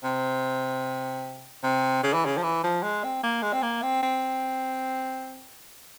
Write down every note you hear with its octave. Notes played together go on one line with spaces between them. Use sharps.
C3
C3
C#3
E3
C#3
F3
E3
F3
G#3
C4
A#3
G#3
C4
A#3
C4
C4